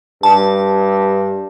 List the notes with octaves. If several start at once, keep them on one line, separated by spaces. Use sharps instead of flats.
G2 A5